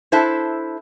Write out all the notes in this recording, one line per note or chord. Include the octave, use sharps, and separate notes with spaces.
D4 E4 A4 C5 E5 A5